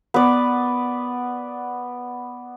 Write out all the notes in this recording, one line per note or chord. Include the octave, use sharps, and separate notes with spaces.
B3 D5